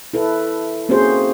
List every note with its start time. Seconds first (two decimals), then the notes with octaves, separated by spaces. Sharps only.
0.14 E4 A4 B4
0.89 A#3 C4 C#4 F#4 G#4 C5